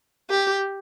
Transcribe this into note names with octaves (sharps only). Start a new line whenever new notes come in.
G4